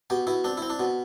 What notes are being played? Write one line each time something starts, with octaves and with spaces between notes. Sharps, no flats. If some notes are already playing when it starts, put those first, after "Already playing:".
B2 G4
B2 E4
C4 D4
C4 E4
D4
B2